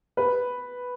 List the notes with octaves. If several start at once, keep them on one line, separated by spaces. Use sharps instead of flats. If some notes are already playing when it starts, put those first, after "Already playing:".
B4